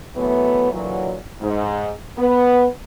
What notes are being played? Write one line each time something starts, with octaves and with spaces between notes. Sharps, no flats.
E3 F#3 A3 B3
A#2 D3 E3 F#3
G#2
B3